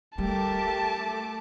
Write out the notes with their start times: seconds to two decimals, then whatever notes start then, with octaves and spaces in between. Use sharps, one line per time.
0.18 G3 A3 G4 A#4 A5 D6